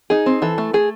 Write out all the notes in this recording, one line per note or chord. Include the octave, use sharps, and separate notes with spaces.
D#4 G#4
C4
E3 A4
A3
A3 G#4